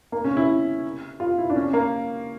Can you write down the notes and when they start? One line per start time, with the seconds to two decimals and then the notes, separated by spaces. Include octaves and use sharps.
0.12 A#3
0.24 C#4
0.37 E4
1.20 F4
1.38 E4
1.50 D4
1.56 C#4
1.73 A#3